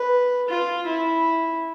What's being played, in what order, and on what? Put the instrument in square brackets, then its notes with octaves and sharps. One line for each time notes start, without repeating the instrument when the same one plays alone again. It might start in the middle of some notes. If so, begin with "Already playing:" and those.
Already playing: [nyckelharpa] B4
F4
E4